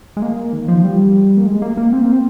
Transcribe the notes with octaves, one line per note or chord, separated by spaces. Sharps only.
G#3
A#3
D#3
F3
G3
A#3
G#3
A#3
A#3
C4
A#3
C4